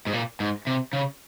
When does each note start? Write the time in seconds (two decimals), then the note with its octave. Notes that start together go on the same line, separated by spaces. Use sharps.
0.07 G#2
0.13 A#2
0.40 G#2
0.67 C3
0.93 C#3